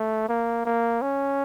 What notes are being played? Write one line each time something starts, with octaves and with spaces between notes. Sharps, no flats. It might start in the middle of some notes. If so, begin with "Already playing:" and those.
Already playing: A3
A#3
A#3
C#4